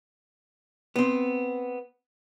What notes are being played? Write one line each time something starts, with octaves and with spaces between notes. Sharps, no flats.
B3 C4